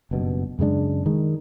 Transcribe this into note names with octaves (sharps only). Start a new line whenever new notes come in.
F#1 G2 B2
F#2 C#3 G#3 D4
D#3 G#3